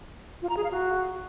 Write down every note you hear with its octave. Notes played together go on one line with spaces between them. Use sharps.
F4
A#5
G#4
F5
F#4